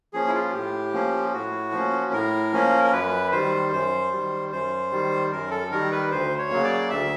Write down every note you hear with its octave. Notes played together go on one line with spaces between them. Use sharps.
F3 A#3 C#4 G#4
E4
F4
A2 G4
F3 A#3 C#4
A2 F#4
F3 A#3 C#4
A2 A#4
F3 A#3 C#4
A#4
F#2 B4
D#3 G3 C5
F#2 C5
D#3 G3
F#2 C5
D#3 G3
F#2 A#4
A4
D#3 G3 A#4
B4
D2 C5
C#5
C#3 F#3 A#3
D5
D2 E5